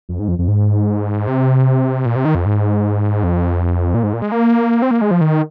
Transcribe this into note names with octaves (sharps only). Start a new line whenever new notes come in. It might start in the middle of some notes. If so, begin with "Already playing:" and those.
F2
G#2
F2
F2
G#2
C3
A#2
C3
D#3
F2
G#2
F2
A#2
G#2
A#2
G#3
A#3
C4
A#3
G#3
F3
D#3